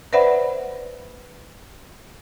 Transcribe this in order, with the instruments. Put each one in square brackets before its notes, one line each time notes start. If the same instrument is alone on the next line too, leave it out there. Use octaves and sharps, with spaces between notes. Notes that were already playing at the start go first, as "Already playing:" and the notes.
[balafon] B4 C5 D5 E5 F#5 B5